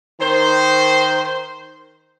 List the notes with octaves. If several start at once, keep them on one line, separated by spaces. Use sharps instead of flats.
D#3 C5